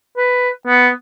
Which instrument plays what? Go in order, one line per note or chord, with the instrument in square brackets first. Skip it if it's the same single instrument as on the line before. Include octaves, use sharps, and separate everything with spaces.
[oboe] B4
B3